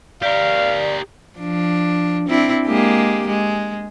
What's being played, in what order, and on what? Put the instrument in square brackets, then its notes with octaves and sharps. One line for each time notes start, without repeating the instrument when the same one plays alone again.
[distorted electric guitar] G4 A#4 [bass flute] D5 [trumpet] F5
[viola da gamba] F3 D4
C4 D4 E4
G#3 A#3 G4
G#3